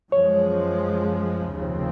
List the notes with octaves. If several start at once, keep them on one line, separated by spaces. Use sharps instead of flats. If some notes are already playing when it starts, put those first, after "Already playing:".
F#2 F3 G#3 C#5
F1 D#2 C#3 F3 C4